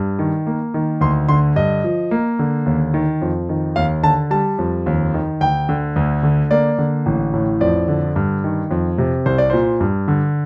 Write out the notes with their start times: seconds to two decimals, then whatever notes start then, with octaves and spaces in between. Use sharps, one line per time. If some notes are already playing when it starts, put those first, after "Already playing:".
Already playing: G2
0.19 D#3
0.47 A#3
0.74 D#3
1.01 D2 C6
1.29 D3 C6
1.56 G2 D#5
1.84 F3
2.11 A#3
2.39 D3
2.66 D#2
2.94 D#3
3.22 F2
3.49 D#3
3.76 D#2 F5
4.03 D3 A5
4.31 G3 A5
4.59 F2
4.86 D#2
5.14 D#3
5.41 D2 G5
5.69 D3
5.96 D2
6.23 D3
6.51 A#3 D5
6.78 D3
7.06 A1
7.34 A2
7.61 F2 D5
7.88 D3
8.16 G2
8.44 D#3
8.71 F2
8.98 C3
9.26 C2 C5
9.38 D5
9.50 A#2 C5
9.80 G2
10.08 D3